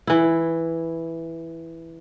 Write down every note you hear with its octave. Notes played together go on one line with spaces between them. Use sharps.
E3 E4